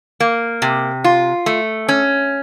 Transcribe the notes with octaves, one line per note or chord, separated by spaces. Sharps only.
A#3
C3
F4
A3
C#4